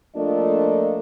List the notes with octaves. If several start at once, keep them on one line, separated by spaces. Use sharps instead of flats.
F3 A3 A#3 D4 F4 D#5